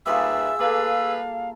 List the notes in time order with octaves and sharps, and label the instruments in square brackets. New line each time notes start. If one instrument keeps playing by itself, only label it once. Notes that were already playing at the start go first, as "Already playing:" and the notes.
[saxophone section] D#2 B4 [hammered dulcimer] G3 F4 G#4 [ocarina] E5 [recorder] E6
[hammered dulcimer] A#3 A4 [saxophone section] G#4 B4 [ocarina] F5